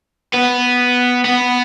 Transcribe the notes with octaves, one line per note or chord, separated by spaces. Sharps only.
B3
B3